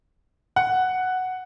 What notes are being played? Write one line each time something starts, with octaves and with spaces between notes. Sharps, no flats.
F#5